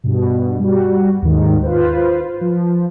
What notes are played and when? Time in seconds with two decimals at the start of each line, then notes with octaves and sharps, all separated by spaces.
0.04 G2 B2
0.60 G3 F#4
1.22 D#2 G#2 D#3
1.63 F4 B4 C5
2.41 F3